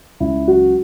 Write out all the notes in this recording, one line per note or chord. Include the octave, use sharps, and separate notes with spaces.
C#2 E4
F#3 F#4